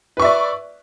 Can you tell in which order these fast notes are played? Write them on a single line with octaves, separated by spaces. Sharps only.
B4 C#6 E5 D5